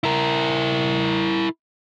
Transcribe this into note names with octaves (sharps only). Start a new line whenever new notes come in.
E4 A#4